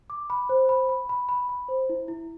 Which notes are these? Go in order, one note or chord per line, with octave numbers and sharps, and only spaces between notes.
D6
B5
C5
B5
B5
B5
B5
B5
C5
E4
E4